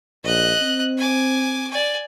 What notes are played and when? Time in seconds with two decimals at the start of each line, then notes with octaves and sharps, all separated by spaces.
0.24 A#1 D#5 F#6
0.61 C4
0.98 G#5 D6
1.71 D5 G#5